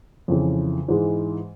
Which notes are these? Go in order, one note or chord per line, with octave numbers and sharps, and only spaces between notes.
F2 C#3 E3
G#2 E3 G#3